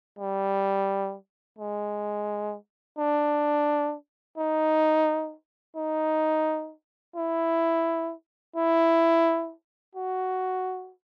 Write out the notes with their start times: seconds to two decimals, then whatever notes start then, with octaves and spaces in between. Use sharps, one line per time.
0.19 G3
1.59 G#3
2.98 D4
4.37 D#4
5.76 D#4
7.16 E4
8.56 E4
9.95 F#4